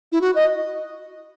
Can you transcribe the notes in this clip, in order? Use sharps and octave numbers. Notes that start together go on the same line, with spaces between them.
E4
F#4
D#5